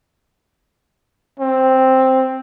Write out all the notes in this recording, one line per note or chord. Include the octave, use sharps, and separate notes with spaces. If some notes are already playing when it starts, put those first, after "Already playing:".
C4